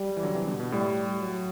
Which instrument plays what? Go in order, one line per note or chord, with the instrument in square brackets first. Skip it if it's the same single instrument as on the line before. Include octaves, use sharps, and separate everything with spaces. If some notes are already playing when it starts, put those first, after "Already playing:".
Already playing: [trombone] G3
[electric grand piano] E3
D3 F#3
C3 E3
B2 D3
B2
[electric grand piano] A2 [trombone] G3
[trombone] F#3